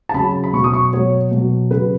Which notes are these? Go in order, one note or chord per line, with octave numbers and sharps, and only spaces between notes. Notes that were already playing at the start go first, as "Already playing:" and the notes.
A5
C#3 F#3 B5
B5
B2 F#3 C#6
D#6
C#6
B2 F#3 C#5
B2
F#3
C#3 F#3 B4